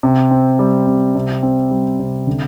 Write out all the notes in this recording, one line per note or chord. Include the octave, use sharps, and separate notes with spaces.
C3
C4
G3
C3
C3
C4
G3
C3
D3